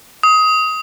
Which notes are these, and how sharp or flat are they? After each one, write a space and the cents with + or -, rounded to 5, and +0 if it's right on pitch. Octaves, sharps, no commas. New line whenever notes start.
D#6 +20